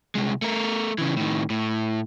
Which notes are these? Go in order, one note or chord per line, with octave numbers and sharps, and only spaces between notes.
C2 G#3
A3 A#4
C#3 E3
A2 D#3
A2